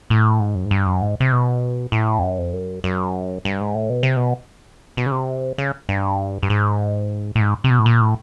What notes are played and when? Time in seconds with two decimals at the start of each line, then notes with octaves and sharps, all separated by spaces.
0.10 A2
0.40 G#2
0.55 F#2
0.65 G#2
0.71 G2
0.86 F#2
1.02 G#2
1.20 C3
1.32 B2
1.92 A2
2.19 F2
2.23 F#2
2.38 F2
2.53 F#2
2.84 F#2
3.45 G2
3.60 G#2
3.75 A2
3.90 B2
4.03 C3
4.17 B2
4.97 B2
5.06 C#3
5.12 C3
5.58 C#3
5.89 G2
6.43 G2
6.50 G#2
7.35 A2
7.41 G#2
7.64 C3
7.70 B2
7.79 A2
7.86 A#2
8.01 A2